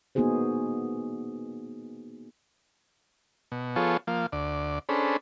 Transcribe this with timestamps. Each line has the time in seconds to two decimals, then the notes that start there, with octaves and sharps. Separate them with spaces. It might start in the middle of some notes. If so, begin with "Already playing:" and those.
0.15 A#3 B3 D#4 F#4 G#4 C5
3.52 B2
3.76 F3 B3 F4 G#4 A4 C#5
4.07 F3 A#3 F5
4.32 D2 D5
4.89 C#4 D4 G#4 A4 C5 B5